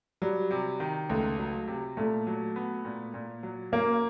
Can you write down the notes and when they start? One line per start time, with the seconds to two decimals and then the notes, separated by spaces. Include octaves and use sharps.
0.22 F#3 G3
0.51 C3
0.80 D#3
1.09 C#2 A3
1.39 F#3
1.68 C3
1.97 A#2 A3
2.27 F#3
2.56 B3
2.85 A#2
3.14 A#2
3.43 F#3
3.72 A#3 C#4